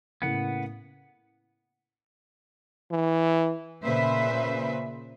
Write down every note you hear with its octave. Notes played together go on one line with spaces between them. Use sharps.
A2 C#3 A#3 B3 F#5
E3
A#2 C#3 B4 C5 E5